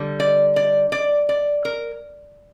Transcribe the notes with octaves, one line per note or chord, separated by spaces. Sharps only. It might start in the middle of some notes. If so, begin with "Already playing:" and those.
Already playing: D3 G3
D5
D5
D5
D5
A#4